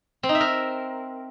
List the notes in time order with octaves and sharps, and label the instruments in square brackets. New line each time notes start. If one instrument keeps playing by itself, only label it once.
[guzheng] C4
D#4
E5
A#4